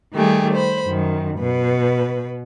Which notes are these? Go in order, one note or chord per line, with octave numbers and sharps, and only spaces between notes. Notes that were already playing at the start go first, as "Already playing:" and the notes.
D#3 G3 A3 G4 G#4
C5 B5
F#2 D#3
B2 B4